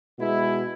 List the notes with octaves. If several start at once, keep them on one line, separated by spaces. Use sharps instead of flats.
B2 G#3 B3 E4